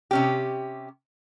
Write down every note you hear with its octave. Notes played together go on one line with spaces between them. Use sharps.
C3 C#4 G4